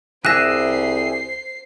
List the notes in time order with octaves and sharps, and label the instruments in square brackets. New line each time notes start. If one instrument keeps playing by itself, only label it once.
[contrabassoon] C2 [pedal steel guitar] G4 G#4 E5 [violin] C5 C7 [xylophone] F#6 A#6